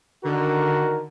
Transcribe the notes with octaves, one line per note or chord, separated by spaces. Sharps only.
D3 D#3 F#4 A#4